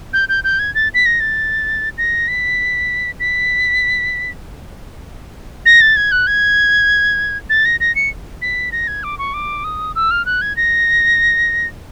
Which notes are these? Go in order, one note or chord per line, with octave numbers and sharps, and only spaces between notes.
G6
G6
G6
G#6
A6
B6
A#6
A6
A#6
B6
B6
A#6
A6
G#6
F#6
G#6
A6
A#6
A#6
C#7
B6
A#6
G#6
D6
C#6
D6
D#6
E6
F6
F#6
G#6
A#6